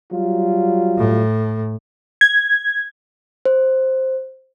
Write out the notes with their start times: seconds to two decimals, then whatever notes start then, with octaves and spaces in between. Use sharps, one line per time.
0.12 F#3 G3 F4
0.97 A2
2.21 G#6
3.46 C5